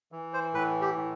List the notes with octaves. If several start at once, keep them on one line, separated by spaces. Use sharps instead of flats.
E3
C5
A2 B4
G4
A2